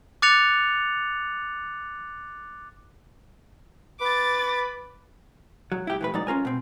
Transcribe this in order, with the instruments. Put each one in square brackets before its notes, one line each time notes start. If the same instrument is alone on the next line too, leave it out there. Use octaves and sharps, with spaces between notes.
[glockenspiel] D6 F#6 A6 C#7 F7
[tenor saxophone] B4 [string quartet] D6 A6
[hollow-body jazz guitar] F#3
E4 G4
E3 A3 B4
G#2 F#3 D#4 D5
C#4 F4 A#4 G#5
B2 C4